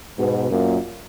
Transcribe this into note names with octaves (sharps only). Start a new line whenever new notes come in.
G#2 B2
F#2 A#2